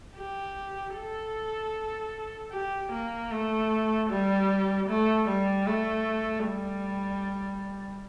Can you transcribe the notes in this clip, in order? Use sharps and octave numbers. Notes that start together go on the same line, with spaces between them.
G4
A4
G4
A#3
A3
G3
A3
G3
A3
G3